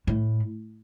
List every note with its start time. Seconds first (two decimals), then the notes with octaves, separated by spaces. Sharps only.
0.07 A2